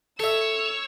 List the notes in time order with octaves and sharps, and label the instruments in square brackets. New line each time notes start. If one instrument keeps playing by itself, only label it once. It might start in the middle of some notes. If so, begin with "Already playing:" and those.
[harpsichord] A4 E5 [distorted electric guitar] C#5 [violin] E6